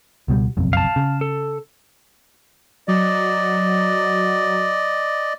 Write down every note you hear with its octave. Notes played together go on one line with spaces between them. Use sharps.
C#2 B2 G3
F#1 B1 F2
F5 A5
C#3
A4
F#3 D5 D#5